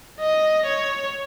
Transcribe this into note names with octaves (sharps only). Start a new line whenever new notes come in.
D#5
C#5